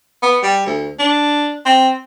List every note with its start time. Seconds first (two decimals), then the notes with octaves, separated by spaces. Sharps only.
0.22 B3
0.43 G3
0.66 D2
0.99 D4
1.66 C4